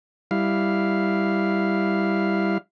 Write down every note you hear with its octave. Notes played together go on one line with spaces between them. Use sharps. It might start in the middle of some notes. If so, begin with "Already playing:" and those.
G3 E4 F5